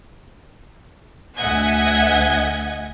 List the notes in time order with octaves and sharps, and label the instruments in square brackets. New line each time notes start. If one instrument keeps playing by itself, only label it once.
[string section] D2 D#5 E5 F#5 G#5 G#6